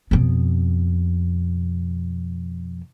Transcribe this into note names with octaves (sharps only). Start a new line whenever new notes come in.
F2 B2